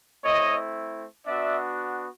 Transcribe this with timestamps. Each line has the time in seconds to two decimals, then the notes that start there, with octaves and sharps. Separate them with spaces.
0.24 A3 C4 E4 C#5 D#5
1.26 B3 D4 F#4 D5 E5